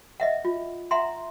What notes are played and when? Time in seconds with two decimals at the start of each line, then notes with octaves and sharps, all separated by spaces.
0.20 D#5 E5 F#5
0.45 F4
0.91 E5 F#5 A#5 C6